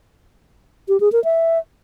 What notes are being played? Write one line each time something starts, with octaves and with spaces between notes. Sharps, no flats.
G4
G#4
A#4
E5